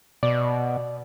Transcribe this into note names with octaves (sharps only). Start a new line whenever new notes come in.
B2 D5